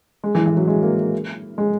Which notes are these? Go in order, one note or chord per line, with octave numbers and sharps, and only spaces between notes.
G#3
E3
E3
F#3
G#3
A#3
G#3